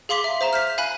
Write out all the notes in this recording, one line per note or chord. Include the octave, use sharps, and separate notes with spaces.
G#4 F5 C6 D6 B6
E5
C5 E5 A#5 E7
F6 G6 B6
F5 G#5 B5 F#6